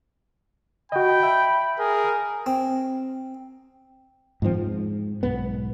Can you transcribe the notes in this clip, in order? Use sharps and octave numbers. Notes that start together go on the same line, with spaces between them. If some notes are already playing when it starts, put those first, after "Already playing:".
F#4 D#5 G5 B5
E5
G#4 A#4
C4
G#2 D#3 F3 C4
G#2
B1 G#2 B3